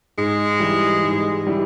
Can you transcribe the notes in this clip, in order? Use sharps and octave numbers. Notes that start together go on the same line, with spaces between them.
G#2 G#3
E3 G3
G#2
E3 G3